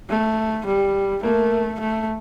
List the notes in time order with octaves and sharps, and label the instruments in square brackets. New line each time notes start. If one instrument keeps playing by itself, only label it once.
[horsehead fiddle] A3
G3
[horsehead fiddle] A3 [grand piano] A#3
[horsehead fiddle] A3